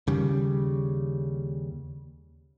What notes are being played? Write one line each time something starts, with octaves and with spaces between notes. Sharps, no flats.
D#2 C#3 G3